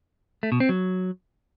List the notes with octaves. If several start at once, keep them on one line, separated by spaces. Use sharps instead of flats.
A3
B2
C4
F#3